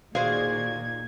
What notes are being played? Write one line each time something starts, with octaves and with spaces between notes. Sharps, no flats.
A#2 D#3 F#4 G#4 C5 D5 F5 G#6